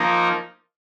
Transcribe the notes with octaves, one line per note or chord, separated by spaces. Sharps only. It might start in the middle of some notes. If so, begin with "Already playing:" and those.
Already playing: F3 A#3 D#4